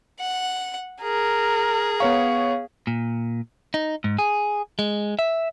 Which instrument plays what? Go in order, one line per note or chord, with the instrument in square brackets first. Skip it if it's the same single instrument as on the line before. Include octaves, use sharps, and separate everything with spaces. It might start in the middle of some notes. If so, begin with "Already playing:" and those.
[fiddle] F#5
[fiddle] G#4 [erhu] A#4
[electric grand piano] B3 C#5 C#6 [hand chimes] F5
[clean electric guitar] A#2
D#4
G#2
G#4
G#3
E5